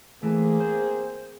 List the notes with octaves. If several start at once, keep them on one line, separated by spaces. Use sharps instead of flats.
E3 A3 A#3 C4 G#4
C5